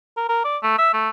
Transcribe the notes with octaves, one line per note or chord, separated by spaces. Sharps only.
A#4
A#4
D5
A3
E5
A3